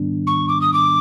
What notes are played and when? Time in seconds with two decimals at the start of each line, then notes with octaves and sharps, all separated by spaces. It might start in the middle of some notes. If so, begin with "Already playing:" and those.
Already playing: G#2 D#3 G3 B3 D4
0.27 C#6
0.49 D6
0.61 D#6
0.73 D6